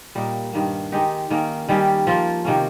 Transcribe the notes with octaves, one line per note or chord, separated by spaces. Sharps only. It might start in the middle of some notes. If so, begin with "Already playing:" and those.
A#2 G3 A#3 D#4
G2 D#3 A#3
D#3 G#3 D#4 G4
D#3 A#3 C#4
D#3 G3 C#4 G4
F3 A#3 F4
C3 D#3 A#3 C#4